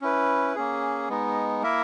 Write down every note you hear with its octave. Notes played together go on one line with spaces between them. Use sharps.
C#4 E4 B4
A#3 C#4 G#4
G#3 B3 D#4
A#3 E4 A#4 E5